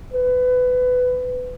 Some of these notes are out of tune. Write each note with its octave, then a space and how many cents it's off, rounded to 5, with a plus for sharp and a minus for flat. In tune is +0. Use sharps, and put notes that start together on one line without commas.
B4 +20